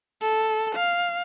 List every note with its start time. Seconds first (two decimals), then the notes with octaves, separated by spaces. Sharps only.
0.22 A4
0.75 F5